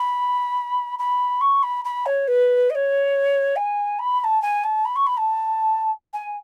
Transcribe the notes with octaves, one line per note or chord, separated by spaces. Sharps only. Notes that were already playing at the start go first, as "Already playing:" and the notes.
Already playing: B5
B5
C#6
B5
B5
C#5
B4
D#5
C#5
G#5
B5
B5
A5
G#5
A5
B5
C#6
B5
A5
G#5